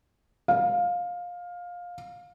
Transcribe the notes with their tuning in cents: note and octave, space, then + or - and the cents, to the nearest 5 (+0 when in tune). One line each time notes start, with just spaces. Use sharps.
F5 +15